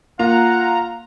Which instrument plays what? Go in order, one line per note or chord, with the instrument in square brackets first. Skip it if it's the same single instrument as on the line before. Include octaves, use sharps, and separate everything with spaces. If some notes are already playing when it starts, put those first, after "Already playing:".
[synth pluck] A#3 [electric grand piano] F4 F5 [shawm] F#5 [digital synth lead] A#5